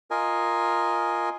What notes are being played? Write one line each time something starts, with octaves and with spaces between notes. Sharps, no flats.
F4 A#4 D#5 G#5